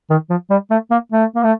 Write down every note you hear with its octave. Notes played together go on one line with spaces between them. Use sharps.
D#3
F3
G3
A3
A#3
A3
A#3
A3